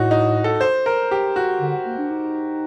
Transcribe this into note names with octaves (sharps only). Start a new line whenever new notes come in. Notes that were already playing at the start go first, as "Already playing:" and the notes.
Already playing: A2 D#4 F#4
D#4
A4
C5
A#4
G4
F#4
D3
A#3
D4
D#4